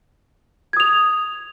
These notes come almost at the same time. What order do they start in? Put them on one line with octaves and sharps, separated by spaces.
G#6 D#6 F7